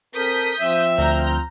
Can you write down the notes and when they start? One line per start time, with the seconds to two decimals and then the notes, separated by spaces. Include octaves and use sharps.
0.15 C4 A4 A#4 D#6 G6 B6
0.60 F3 C4 E5
0.98 D2 A#5 F6 G6